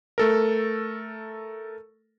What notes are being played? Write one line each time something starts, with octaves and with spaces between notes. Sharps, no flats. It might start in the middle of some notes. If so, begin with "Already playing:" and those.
A3 A4 A#4